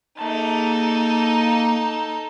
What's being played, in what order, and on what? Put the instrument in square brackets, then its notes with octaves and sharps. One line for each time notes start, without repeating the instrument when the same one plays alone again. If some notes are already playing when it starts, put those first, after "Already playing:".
[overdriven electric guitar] A#3 A5 [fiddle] D#4 A4